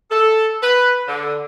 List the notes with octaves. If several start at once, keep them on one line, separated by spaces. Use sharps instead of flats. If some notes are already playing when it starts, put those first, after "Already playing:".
A4
B4
D3